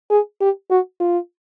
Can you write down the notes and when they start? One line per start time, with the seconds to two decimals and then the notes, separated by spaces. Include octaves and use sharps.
0.10 G#4
0.41 G4
0.71 F#4
1.00 F4